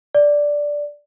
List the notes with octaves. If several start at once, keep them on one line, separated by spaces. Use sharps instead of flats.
D5